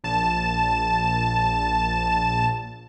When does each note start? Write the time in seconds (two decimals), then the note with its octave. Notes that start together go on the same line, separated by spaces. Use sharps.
0.04 A#1 A5 E7